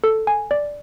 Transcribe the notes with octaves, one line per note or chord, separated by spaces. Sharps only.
A4
G#5
D5